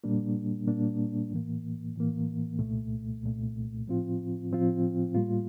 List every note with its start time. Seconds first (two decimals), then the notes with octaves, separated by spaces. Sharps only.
0.04 A#2 G3 A#3 D4
0.67 A#2 G3 A#3 D4
1.31 A2 E3 A#3
1.95 A2 E3 A#3
2.59 C2 A#2 A3
3.23 C2 A#2 A3
3.87 A2 F3 C4 F4
4.51 A2 F3 C4 F4
5.15 A2 G3 A#3 F4